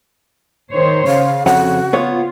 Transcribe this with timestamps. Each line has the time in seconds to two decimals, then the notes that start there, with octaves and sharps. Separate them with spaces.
0.72 D#3 C5 C#5
1.07 C#3 F5
1.46 F2 F#4 C#5 F#5
1.93 B3 F4 C#5